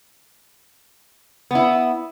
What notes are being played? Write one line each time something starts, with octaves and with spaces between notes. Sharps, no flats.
B3 E4